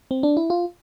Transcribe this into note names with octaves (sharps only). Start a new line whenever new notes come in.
C4
D4
E4
F4